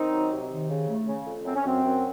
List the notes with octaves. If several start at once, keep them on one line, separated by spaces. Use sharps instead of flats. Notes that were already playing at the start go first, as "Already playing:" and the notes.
Already playing: D#3 C4 D#4
F#3
C3
D#3
C#3
A3
C#3
F2
F#2 C4
C#4
F#2 C4
F#2